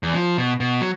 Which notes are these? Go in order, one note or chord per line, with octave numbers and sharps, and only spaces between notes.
E2
F3
B2
B2
F#3